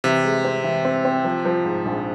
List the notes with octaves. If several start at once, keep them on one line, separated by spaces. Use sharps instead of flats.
C3 E3
G#3
C4
E3
C4
C4
F3
F3
G#2
A#1